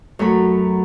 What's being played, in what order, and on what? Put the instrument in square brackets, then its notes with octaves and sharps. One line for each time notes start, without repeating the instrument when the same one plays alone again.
[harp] F#2 F#3 A3 B5